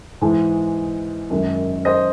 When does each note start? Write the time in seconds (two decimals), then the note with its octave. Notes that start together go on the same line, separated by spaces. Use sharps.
0.21 G#2 E3 G#3
1.30 F#2 D#3 G#3
1.85 C5 D#5